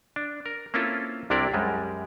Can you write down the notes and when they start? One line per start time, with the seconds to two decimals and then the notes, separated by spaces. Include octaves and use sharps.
0.16 D4
0.46 A#4
0.74 A#3 C4 C#4 E4 F4 A4
1.30 C2 C3 D4 E4 A#4 D5
1.54 F#2 G3 G#3